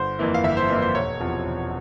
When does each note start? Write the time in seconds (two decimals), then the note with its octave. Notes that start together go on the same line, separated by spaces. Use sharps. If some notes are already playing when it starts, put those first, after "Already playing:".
Already playing: G1 C5
0.19 F2 E3 A#3 E4
0.34 F5
0.44 G1 E5
0.57 C5
0.70 F2 E3 A#3 E4
0.82 C5
0.95 E1 C#5
1.20 E2 C3 F3
1.46 E1